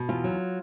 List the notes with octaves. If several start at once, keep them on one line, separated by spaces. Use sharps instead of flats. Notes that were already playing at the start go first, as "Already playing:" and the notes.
Already playing: B2
E2 F4
F#3